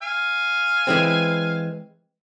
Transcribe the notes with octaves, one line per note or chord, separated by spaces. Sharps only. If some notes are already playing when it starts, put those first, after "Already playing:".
F5 G#5
E3 G#3 C4